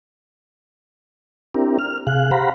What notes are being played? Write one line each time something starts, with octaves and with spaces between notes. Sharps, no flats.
C4 D4 E4 G4 A#4
F6
C3 G#4 F5 F#6
G4 C5 F5 F#5 A#5 B5